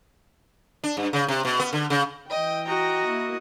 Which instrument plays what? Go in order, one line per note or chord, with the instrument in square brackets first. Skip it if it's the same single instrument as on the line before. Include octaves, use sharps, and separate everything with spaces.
[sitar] D4
G2
C#3
C3
B2
B3
D3
C#3
[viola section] E3 G5 [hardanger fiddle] D#5
[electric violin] F#4 D#5 [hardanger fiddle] A#5
[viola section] A#3 E4